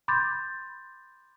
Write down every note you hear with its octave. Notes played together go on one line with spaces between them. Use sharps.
B5 C6 D6 G6 A6